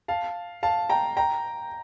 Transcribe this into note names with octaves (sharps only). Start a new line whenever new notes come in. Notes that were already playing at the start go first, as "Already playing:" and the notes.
F5 A5
F5 A5
G5 A#5
G5 A#5